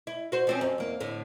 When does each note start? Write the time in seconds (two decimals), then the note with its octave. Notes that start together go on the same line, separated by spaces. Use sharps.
0.07 E4
0.32 F#4 C5
0.47 F3 C4 C#4
0.61 F#2
0.78 E2 A#3
1.00 A2 D3